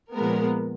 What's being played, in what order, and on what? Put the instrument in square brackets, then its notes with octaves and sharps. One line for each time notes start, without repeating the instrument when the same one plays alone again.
[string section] A#2 F3 G#3 B3 A#4